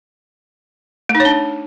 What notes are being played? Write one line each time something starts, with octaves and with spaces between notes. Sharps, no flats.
A3
D#4
C#5
D4